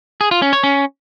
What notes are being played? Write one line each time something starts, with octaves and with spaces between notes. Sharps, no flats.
G#4
F4
C#4
C#5
C#4